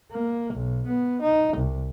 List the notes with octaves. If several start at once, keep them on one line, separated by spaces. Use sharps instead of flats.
A#3
B1
B3
D#4
C2